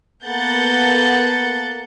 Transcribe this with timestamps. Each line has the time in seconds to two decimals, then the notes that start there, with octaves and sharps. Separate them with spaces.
0.24 A#3 B3 A4 F#5 G6 A6